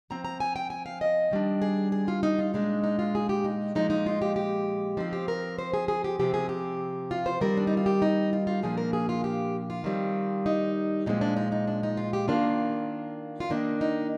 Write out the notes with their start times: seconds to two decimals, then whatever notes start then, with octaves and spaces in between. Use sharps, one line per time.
0.10 F3 C4 A#5
0.25 A#5
0.40 G#5
0.56 G5
0.70 G#5
0.86 F5
1.01 D#5
1.31 D#3 G3 D4
1.62 G#4
1.92 G#4
2.08 F4
2.23 D#4
2.39 F4
2.54 A#2 G#3 D4 D#4
2.84 D#4
2.99 F4
3.15 G#4
3.29 G4
3.45 D#4
3.75 A#2 F3 G#3 D#4
3.90 D#4
4.06 F4
4.22 G4
4.36 G4
4.97 F3 C4 D#4
5.13 G4
5.28 A#4
5.59 C5
5.74 G#4
5.88 G#4
6.04 G4
6.19 C3 F3 C4 G4
6.34 G#4
6.49 G4
7.11 F4
7.26 C5
7.41 D#3 G3 C4 A#4
7.57 D4
7.67 D#4
7.77 F4
7.86 G4
8.02 D#4
8.33 F4
8.47 F4
8.63 A#2 F3 A#3 D4 G#4
8.78 A#4
8.93 G#4
9.09 F4
9.24 G4
9.70 F4
9.84 D#3 G3 C4
10.46 D#4
11.06 A#2 F3 G#3 C4 D#4
11.21 D4
11.37 D#4
11.52 D#4
11.67 D4
11.83 D#4
11.97 F4
12.13 G4
12.28 D#3 A#3 D4 F4
13.40 F4
13.50 D#3 A#3 D4 D#4
13.81 D#4